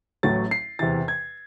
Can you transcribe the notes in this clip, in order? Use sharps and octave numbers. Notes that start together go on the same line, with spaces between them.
A1 A2 F#3 A6
C7
E2 C3 E3 A6
G#6